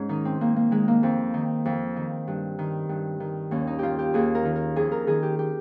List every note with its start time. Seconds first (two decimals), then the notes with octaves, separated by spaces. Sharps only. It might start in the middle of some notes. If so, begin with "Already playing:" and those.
Already playing: G#2 C#4
0.09 D#3 D#4
0.25 C4
0.41 G#2 A#3
0.56 A#3
0.71 D#3 G#3
0.88 A#3
1.03 F2 C4
1.34 D#3
1.65 F2
1.96 D#3
2.27 G2
2.59 D#3
2.89 G2
3.20 D#3
3.51 D#2 C#4
3.67 D#4
3.79 D#3 F4 G4
3.99 G4
4.14 D#2 G#4
4.35 A#4
4.45 D#3
4.56 A#4
4.76 F2 G#4
4.92 A#4
5.07 D#3 G#4
5.23 G4
5.39 G4